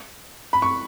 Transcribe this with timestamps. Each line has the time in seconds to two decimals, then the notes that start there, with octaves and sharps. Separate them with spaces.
0.53 B5
0.62 C#6